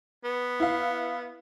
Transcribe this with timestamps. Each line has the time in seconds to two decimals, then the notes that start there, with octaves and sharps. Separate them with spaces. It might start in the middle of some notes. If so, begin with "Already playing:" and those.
0.24 B3
0.60 E4 F5